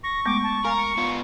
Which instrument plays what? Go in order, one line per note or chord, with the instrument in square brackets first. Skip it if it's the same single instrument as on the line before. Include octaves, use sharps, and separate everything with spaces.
[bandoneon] C#6 [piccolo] A#6
[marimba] G#3 A3 B3 [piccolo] D6
[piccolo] A5
[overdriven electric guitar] A#4 [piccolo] F5 [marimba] G#5 A#5
[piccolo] C#7
[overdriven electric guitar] B3 F4